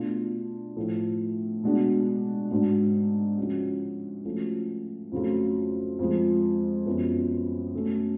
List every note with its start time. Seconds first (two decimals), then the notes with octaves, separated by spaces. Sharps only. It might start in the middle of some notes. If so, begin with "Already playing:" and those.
Already playing: B2 A3 D4 F4
0.76 A2 F3 A3
1.63 B2 G#3 D4 F#4
2.51 G#2 G#3 D4 F#4
3.38 C#3 F3 G#3 C#4 F#4
4.25 F3 A3 C#4 F#4
5.12 F2 C#3 F#3 A3 F4
5.99 F2 F3 G#3
6.86 F#2 F3 B3
7.74 C#3 F#3 A3 C#4